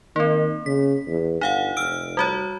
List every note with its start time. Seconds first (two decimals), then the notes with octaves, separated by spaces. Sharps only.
0.16 D#3 A#3 C4
0.66 C#3 B6
1.06 E2
1.41 G1 D#4 F5 F#5
1.77 F1 E6 F6 D7
2.17 G3 F#4 C#5